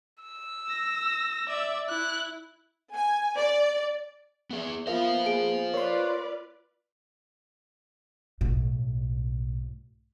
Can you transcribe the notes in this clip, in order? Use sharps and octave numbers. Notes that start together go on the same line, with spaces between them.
E6
A#6
D5 E5
E4 F#6
G#5
D5
B3 G#4
A#3 B3 F4 A#4 C5 E5 F5
G#4 D7
F4 A#4 B4 C#5 D5 C6
B1 A2